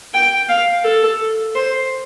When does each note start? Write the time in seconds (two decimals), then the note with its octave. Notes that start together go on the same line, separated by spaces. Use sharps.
0.14 G5
0.49 F5
0.84 A4
1.55 C5